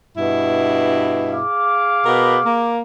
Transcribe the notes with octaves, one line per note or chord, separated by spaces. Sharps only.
G2 B2 E4
G#4 F5 D6
B2 B3 A#4
A#3